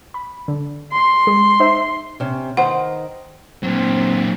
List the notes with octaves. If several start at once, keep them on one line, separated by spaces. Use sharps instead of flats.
B5
D3
C6
G#3 G#4
D#4 C5 E5
C3 C#4
D#3 C5 F#5
A#2 F#3 C4